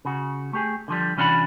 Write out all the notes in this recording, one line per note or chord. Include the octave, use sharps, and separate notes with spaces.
C#3 F#4
A3 G4 G#4
D3 F3 G3
C2 E3 C#4 D4 F#4 B5